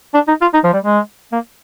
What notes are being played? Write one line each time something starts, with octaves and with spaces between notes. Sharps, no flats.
D4
D#4
F4
D#4
F3
G3
G#3
A#3